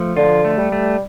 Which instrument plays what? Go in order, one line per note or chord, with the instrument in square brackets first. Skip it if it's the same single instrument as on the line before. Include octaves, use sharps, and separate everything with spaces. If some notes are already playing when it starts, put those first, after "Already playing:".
Already playing: [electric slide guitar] F3 A3
[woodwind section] D3 [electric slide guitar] F4
[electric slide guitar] A3
[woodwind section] G3
[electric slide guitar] A3